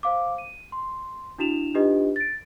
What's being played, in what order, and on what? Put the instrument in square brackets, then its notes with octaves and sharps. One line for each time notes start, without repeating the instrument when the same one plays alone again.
[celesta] C5 F5 D6
D#7
C6
D4 E4 F#4 E7 F7
D4 D#4 F4 G4 B4 D#5
A6 D7